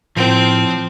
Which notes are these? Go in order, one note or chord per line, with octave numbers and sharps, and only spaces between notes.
A2 F3 C4